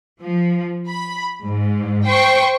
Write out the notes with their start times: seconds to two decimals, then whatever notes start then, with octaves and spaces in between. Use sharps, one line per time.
0.21 F3
0.88 B5
1.44 G#2
2.07 C5 G5 C#6